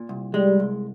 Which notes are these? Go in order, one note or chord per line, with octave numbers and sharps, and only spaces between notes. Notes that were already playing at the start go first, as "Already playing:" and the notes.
Already playing: A#2
C2
G3 G#3
C2